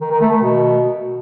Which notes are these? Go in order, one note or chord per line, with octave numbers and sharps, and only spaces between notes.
D#3
D#3
A3
D#3
B2